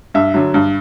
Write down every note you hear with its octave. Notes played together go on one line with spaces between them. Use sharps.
G2 E5
D3 F#3
G2